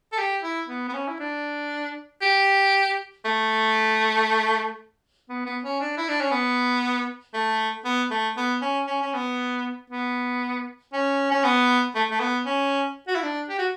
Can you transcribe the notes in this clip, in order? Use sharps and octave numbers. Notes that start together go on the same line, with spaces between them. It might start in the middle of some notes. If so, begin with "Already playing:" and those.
A4
G4
E4
B3
B3
C#4
E4
D4
G4
A3
B3
B3
C#4
D4
E4
D4
C#4
B3
A3
B3
A3
B3
C#4
C#4
C#4
B3
B3
C#4
C#4
B3
A3
A3
B3
C#4
F#4
E4
D4
G4
F#4